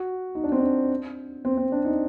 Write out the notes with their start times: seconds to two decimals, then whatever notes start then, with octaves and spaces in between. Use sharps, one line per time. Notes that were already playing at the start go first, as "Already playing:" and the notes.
Already playing: F#4
0.35 D#4
0.44 D4
0.52 C4
0.59 D4
1.45 C4
1.58 C4
1.72 D4
1.85 D#4